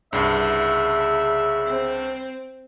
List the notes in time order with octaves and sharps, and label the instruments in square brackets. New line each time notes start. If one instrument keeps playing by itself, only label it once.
[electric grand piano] C2 G2 [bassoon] C#3 [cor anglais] E5
[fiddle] C4